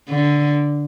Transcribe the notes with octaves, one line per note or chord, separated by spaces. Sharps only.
D3